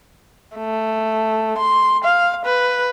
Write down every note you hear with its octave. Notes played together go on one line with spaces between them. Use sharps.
A3
C6
F5
B4